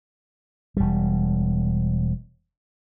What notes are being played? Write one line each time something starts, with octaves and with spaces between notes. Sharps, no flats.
E1 G3